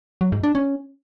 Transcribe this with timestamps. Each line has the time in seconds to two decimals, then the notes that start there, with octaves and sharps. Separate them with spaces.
0.21 F#3
0.32 G#2
0.43 D4
0.55 C#4